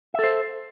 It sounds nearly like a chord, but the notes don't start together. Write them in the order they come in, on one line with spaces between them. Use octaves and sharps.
E5 A4 C5